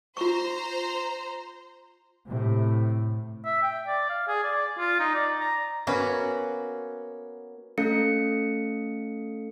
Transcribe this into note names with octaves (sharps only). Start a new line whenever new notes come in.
F4 C5 A#5 C6 C#6
A2 C3
E5
G5
D5
F5
G#4
D5
F4
D#4
D5
A#5
A#3 B3 C#4 F#4
A3 C#4 A4 F5 C#7